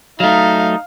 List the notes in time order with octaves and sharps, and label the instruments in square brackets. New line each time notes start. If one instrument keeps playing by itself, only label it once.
[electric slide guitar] F#3 A3 [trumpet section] D#4 [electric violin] F5